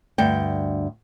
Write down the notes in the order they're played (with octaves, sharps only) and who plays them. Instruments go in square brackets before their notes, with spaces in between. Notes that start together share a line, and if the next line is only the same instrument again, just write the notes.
[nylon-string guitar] D2 G2 G5